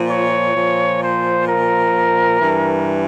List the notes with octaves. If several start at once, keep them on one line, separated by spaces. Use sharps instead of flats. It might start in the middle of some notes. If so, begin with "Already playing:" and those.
Already playing: A#2 F3
C#5
A#2 F3
C5
A#4
G2 E3